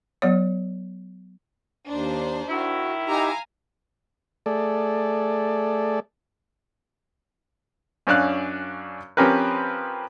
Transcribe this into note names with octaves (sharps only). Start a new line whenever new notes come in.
F#3 B3 C#5
D#2 D4 D#4 C5
D#3 E4 F#4
D#4 G4 F5 G#5 A#5
A3 G#4 A4 D5
F#2 C#4 D4 F5 F#6
F3 C4 C#4 G4 A#4 B4